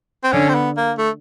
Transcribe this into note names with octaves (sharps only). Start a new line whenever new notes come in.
C4
D3 C#4
C4
B3
A#3
A3